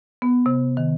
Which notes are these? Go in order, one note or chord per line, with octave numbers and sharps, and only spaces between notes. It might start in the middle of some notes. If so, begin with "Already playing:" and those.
B3
C3
D#3